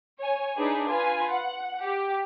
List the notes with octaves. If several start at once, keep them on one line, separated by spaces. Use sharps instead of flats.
C#5 G#5
D4 D#4 G#4 B4
F4 B4 G#5
F#5
G4